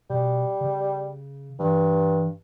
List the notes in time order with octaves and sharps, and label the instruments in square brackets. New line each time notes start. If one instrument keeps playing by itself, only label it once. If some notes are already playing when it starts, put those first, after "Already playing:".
[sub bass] B2 [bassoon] G3
[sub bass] C#3
[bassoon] G2 [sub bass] E3